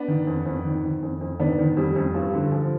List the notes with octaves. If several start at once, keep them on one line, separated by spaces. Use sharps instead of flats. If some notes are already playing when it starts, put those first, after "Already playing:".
Already playing: B3 D4
D#3
F2
F2
D#3
D#3
F2
F2
D#3 B3 D4
D#3
F2 G3
F2
G2
D3
F3